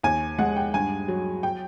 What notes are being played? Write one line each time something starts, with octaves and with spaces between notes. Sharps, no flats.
D#2 G#5
G#3 F#5
G5
G2 G#5
F#3
G5